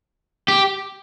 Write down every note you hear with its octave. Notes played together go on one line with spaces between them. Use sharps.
G4